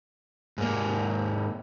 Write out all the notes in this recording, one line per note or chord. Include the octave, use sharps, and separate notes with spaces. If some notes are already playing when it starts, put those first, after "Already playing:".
G#2 A#3